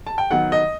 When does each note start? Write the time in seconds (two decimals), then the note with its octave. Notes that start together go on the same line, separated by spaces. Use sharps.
0.07 A5
0.18 G5
0.31 D#3 F#3 B3 F#5
0.52 D#5